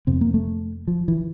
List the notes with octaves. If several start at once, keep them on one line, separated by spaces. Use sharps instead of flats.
F2 C3 C4
A#3
A3
F3
E3